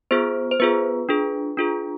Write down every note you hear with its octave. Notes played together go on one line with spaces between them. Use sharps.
B3 F4 G#4 C5
C5
B3 F4 G#4 B4
D4 F4 G#4
D4 F4 G#4